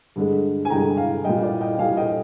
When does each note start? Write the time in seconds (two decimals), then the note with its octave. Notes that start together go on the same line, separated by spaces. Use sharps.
0.16 G2 D3 G#3
0.65 G#5
0.70 G2 D3 G#3 G5 A#5
0.97 F5 G#5
1.24 A#2 G3 D#5 G5
1.43 D5 F5
1.61 D#5 G5
1.74 G5
1.79 A#2 G3 F5 G#5
1.97 D#5 G5